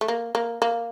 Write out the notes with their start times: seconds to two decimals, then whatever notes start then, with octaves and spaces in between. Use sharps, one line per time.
0.01 A3
0.08 A#3
0.35 A#3
0.62 A#3